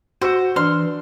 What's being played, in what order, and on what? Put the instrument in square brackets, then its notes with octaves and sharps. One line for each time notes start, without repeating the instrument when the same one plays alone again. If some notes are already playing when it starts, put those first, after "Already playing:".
[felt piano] F#4 E6 C#7 [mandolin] C5
[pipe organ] E3 [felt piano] D4 [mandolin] C6 F6